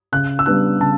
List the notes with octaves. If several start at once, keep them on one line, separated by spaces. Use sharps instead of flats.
C#3 F#6
E6
G3 B3 D4 F#6
C#3 A5